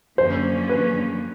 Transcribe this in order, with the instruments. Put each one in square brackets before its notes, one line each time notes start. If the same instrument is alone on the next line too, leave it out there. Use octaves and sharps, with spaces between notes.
[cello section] F#2 D3 F3 A#3 C#4 [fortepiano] C5
[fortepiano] B4